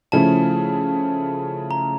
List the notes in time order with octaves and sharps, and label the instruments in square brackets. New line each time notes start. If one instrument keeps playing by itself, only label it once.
[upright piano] C#3 F3 A3 C#4 E4 [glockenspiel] A5
[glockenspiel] A#5